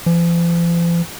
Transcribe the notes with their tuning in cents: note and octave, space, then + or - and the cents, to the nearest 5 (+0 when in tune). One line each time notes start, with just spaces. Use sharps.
F3 -45